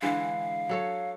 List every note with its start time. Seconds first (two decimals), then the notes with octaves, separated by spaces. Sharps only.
0.02 D3 E3 G#3 F5
0.69 F#3 A4 C#5